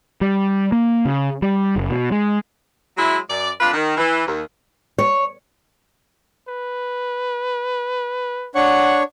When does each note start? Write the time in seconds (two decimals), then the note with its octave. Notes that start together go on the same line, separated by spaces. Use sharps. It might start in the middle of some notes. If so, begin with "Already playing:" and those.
0.21 G3
0.72 A#3
1.05 C#3
1.42 G3
1.76 F#1
1.91 B2
2.12 G#3
2.97 F#3 G#3 E4
3.30 F#2 D5
3.61 F2 D4 F4 B4
3.74 D#3
3.98 E3
4.27 D#2
4.98 C#5
6.48 B4
8.55 D4 C#5 F#5 C#6